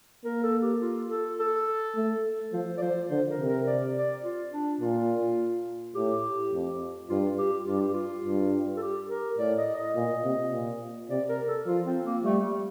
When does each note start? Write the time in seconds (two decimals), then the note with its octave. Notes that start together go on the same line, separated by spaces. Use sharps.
0.25 A#3 A#4
0.43 A4
0.62 G4
0.81 F4
1.10 A4
1.39 A4
1.96 A3
2.53 F3 C5
2.78 D5
2.81 F3 C5
3.10 D3 C5
3.29 A#4
3.39 C3
3.48 A#4
3.67 D5
3.97 D5
4.24 F4
4.53 D4
4.81 A#2 F4
5.95 A2 G4
6.53 F2
7.09 G2 F4
7.39 G4
7.67 G2 F4
7.80 G4
7.94 F4
8.25 G2
8.77 A4
8.82 G4
9.10 A#4
9.38 A2 D5
9.58 D#5
9.76 D#5
9.95 A#2
10.24 C3
10.53 A#2
11.10 C3 D5
11.29 A#4
11.48 A4
11.66 F3 F4
11.86 C4
12.05 A#3
12.24 G3 A3
12.43 G3